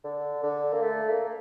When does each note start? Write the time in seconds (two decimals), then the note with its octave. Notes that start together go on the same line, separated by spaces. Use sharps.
0.04 D3
0.43 D3
0.73 A#3
0.82 A3
1.09 A#3
1.25 A#3